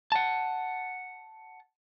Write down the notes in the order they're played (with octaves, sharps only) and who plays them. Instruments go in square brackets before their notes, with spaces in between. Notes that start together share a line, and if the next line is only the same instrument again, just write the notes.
[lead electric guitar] F#5 A5